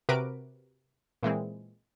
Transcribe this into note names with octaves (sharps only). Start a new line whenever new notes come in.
C3 F#4 A#4 B4 D6 D7
A#2 E3 G#3 C4